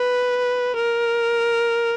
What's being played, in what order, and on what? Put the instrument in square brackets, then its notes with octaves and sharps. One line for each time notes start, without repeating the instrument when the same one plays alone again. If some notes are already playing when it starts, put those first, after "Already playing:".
Already playing: [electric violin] B4
A#4